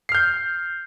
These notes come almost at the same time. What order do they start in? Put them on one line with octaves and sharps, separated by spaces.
C7 F6 G6